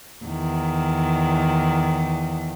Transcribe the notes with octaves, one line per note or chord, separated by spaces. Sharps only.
E2 D#3